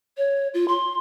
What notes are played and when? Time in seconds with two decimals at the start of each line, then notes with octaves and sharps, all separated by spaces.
0.17 C#5
0.54 F4
0.68 C6